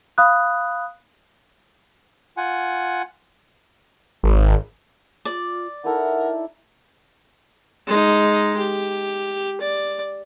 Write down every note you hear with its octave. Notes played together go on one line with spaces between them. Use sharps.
F5 B5 D#6 F#6
F4 F#5 G#5
G#1
F4 D5
D#4 E4 A4 A#4 F#5
G#3 D#4
G4
D5